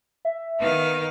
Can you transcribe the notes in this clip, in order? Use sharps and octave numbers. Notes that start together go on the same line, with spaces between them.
E5
D#3 B3 F5